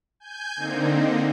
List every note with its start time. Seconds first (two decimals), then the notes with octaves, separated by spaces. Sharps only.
0.20 G#5 G6
0.56 D3 A#3 C4 D#4